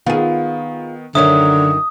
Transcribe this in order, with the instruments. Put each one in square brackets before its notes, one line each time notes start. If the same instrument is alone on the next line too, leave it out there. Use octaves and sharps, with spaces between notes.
[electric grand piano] D#3 B3 [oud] F4 G#4
[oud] F#2 D#3 [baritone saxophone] D3 [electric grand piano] C#5 E5 [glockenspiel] D#6